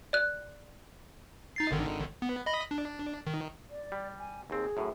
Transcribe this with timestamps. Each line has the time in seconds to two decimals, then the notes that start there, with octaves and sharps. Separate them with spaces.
0.13 D5 F#6
1.56 D#4 A6 C7
1.71 G#1 D3 D#3
2.22 B3
2.46 D#5 B5 A#6
2.71 D4
3.27 D#3
3.69 D5
3.92 G3
4.18 G#5
4.50 D#2 C4 G#4
4.77 F#2 A2